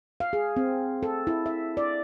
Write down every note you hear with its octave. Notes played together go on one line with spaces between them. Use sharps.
F5
G#4
C4
A4
E4
E5
D5